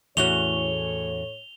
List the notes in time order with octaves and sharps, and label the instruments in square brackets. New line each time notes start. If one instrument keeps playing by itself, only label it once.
[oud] E2 C#4 F#4 [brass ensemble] A2 C#5 [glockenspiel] F7 G7